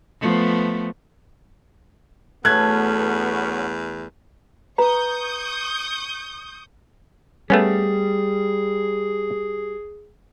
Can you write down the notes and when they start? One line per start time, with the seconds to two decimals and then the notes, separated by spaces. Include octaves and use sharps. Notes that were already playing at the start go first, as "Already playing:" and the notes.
0.21 F3 A3 B3
2.45 E2 F#3 A3 B3 C#4 F#6 G#6
4.78 B4 A#5 C#6 D#6 G6
7.50 G3 A3 B3 C#4 G#4